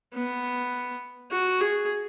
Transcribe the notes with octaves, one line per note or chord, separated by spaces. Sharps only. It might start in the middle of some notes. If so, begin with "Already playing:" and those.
B3
F#4
G#4